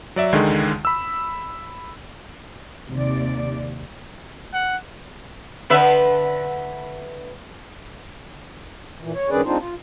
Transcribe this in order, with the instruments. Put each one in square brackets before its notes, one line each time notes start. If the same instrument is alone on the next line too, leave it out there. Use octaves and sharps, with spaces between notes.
[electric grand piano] F#3 D5 E5
C#2 D3 D#3 G#3
B5 E6
[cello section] D#2 C3 D5
[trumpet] F#5
[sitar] D3 B4 E5
[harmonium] A#2 E3
C#5
G2 D#3 C#4 G#4 B4 D5
G#3 C4 D4 D#4 F4 C5
F4